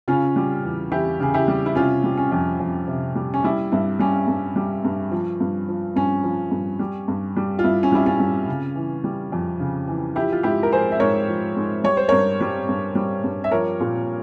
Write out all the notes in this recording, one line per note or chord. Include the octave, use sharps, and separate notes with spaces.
C#3 C#4 F4
G3
E2
E2 E4 G4
C#3 G#4
E4 G4
G3
E4
C3 C#4 F4
G3
C#4
F2
F2
C3
G3
C#4
G3 E4
G2 E4
G3 C#4
G2
G3
G2
F3
G2
F3
G2 C#4
F3
G2
G3
G2
G3
F4
G2 E4
C#4
G3 E4
C#4 F4
G2
C#3
E3
G3
F2
C#3
E3
F3 E4 G4
F4
G#2 E4 G4
A#4
F3 G#4 C5
E5
G#2 A#4 C#5
F3
G#2
G3 C#5
C5
G2 A#4 C#5
G3
G2
G3
G2
E5
F3 A#4 C#5
A#2